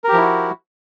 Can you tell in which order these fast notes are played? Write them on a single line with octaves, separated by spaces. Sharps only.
A#4 G4 F3 E4 F#4